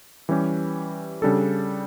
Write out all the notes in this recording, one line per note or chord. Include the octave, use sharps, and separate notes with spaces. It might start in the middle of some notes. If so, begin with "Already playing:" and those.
E3 G3 C#4 G4 B4
C#3 G3 D4 A4